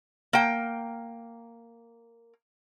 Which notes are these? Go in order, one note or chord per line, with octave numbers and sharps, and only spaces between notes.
A#3 G5